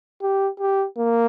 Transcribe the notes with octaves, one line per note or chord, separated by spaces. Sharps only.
G4
G4
A#3